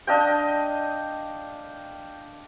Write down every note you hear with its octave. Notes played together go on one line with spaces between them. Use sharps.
D4 D#5 F5 G5